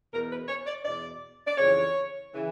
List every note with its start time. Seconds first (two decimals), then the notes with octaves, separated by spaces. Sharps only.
0.13 E2 B2 A#4
0.30 B4
0.48 C#5
0.66 D5
0.85 E2 B2 D5
1.47 D5
1.57 F2 C#3 E3 C#5
2.33 C#3 E3